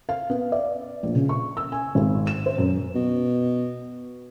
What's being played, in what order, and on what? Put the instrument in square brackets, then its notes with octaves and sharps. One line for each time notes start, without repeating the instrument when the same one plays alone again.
[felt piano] F5
B3
D5
A#1
C#3
C#6
E6
G#5
G#1
E7
C5
F#2
[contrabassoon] B2